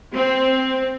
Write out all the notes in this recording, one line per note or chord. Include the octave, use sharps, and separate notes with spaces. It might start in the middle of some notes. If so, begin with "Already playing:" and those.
C4